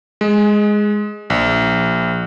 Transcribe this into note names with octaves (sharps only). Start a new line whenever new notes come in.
G#3
A#1